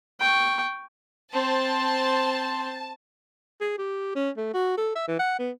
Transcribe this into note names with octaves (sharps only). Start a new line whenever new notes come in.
G5 C#6
C4 C5 A5
G#4
G4
C#4
A3
F#4
A4
E5
E3
F#5
B3